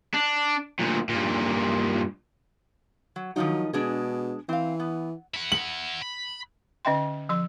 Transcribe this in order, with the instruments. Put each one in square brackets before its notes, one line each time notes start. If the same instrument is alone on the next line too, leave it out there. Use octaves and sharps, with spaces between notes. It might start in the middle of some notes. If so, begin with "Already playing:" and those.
[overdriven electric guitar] D4
D2 A#2
G2 A#2
[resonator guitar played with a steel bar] F#3
[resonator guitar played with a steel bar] D#3 F3 D#4 [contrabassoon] F#3
[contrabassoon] B2 [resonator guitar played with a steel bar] G#3 D4 G#4
[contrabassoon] E3 [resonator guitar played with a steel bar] C4 F5
[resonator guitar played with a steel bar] B3
[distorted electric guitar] E4 F#5
[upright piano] F#7
[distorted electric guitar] B5
[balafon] D3 C#4 D#5 E5 G5 C6
F3 C6